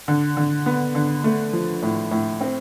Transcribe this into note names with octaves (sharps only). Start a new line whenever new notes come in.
D3
D3
B3
D3
A3
F3
A2
A2
C4